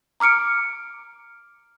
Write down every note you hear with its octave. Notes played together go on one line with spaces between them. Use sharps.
A#5 D6 F6 C#7 D7